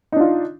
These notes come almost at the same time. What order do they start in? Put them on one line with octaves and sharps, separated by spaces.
D#4 D4 F4